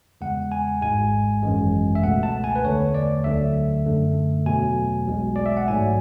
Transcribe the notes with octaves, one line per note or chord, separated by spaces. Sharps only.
E2 C#3 G#3 F#5
G#5
G#1 G#2 G#3 G#5
G#1 F#2 E3 G#3
E5
C#2 B2 A3 F#5
A5
G#5
B4
E2 D3 A3 C#5
D5
D2 D3 F#3 A3 E5
F#2 D3 A3
E2 B2 F#3 A3 G#5
B1 B2 G#3
D5
E5
F#5
A1 G#2 F#3 A3 G#5